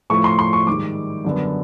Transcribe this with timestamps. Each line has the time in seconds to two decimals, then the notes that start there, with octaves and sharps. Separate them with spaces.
0.10 A2 F3 A3 C#6
0.24 C6
0.39 C6
0.53 C#6
0.67 G#2 D#3 G3 D6
1.25 F#2 D3 G3 B3